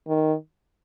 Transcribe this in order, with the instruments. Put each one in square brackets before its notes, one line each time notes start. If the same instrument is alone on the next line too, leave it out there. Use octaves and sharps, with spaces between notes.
[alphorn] D#3